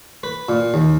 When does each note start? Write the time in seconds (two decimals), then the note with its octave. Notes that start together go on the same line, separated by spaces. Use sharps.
0.23 B4
0.49 A#2
0.74 D#2